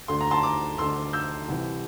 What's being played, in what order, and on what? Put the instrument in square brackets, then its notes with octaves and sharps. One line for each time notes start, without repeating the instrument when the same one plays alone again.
[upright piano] D2 D3 C6
A#5
A5 C6
A#5 D6
D2 D3 C6 E6
E6 G6
C2 C3 E3